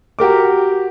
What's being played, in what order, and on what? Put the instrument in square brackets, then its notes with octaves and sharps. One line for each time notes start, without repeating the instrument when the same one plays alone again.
[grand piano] F#4 G4 A#4 D6